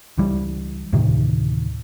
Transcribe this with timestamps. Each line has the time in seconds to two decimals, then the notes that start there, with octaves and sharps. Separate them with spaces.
0.17 C#2 E3 G3
0.92 D2 A2 C3 D#3